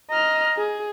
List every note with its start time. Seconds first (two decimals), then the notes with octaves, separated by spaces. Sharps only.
0.11 D#5 A#5 F6
0.57 G#4